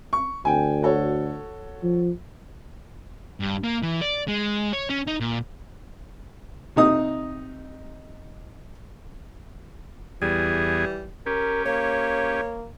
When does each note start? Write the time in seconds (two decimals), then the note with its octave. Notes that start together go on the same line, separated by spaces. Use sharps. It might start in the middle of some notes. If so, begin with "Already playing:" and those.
0.13 C#6
0.45 D2 G5 G#5
0.83 F#4 A4 C#5
1.83 F3
3.40 G2
3.64 A#3
3.83 E3
4.02 D5
4.28 G#3
4.73 C#5
4.90 C#4
5.07 D#4
5.20 A#2
6.76 C3 D#4 D#6
10.22 E2 E3 G3 G#4
11.26 C#4 G4 A#4
11.66 A#3 C#5